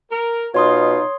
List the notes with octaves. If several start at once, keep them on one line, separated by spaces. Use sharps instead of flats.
A#4
B2 D#4 F4 C#5 C6 D#6